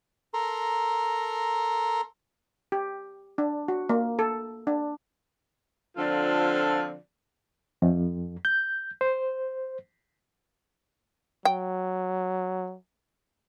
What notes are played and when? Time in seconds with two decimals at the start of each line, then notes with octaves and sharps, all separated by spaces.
0.34 A4 A#4 A#5 C6
2.72 G4
3.38 D4
3.68 F#4
3.89 A#3
4.19 A4
4.67 D4
5.97 D3 F3 C4 F4 A4 D5
7.82 F2
8.45 G6
9.01 C5
11.45 F#3 G5